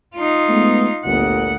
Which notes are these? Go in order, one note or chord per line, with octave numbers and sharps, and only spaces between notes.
D#4 F4
G#3 A3 B3
G1 D2 A#2 F#5